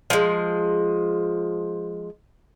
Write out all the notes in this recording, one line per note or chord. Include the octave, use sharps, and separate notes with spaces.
F3 G#3